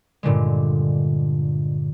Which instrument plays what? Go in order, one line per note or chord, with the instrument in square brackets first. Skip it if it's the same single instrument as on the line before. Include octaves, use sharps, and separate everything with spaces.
[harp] G2 A#2 D3 G#3